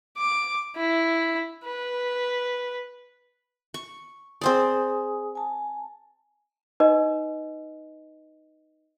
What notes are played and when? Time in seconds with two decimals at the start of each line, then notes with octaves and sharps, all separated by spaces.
0.18 D6
0.76 E4
1.66 B4
3.74 C#6
4.41 C4 G#4 C5 D5 G#5 D#6
5.35 G#5 A5
6.80 D#4 B4 D#5